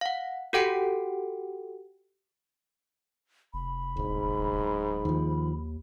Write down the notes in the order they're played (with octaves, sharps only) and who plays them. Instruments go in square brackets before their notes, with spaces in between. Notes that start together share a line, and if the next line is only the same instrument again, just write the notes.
[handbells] F5 F#5
F#4 G4 A4 F#5 G5 D7
[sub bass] F1 [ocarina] B5
[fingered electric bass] D1 [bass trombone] G#2
[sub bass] D#2 [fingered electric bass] D#3 F3